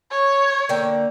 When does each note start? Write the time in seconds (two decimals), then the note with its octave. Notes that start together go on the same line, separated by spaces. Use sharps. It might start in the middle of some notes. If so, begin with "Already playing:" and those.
0.10 C#5
0.69 D3 A#3 G5